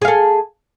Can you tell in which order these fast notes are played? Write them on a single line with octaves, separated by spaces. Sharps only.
G#4 F5 A4